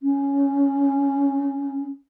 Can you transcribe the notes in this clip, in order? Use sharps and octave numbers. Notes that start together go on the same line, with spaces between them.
C#4